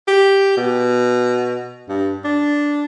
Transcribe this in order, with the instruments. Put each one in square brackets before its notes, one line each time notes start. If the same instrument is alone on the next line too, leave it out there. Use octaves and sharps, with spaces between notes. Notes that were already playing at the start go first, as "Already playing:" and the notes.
[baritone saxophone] G4
B2
G2
D4